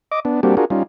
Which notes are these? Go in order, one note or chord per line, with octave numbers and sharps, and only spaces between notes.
D#5 D6
B3 D4
G3 A#3 C4 D4 F#4 G4
D4 F4 F#4 G#4 A#4
G3 C#4 D#4 F4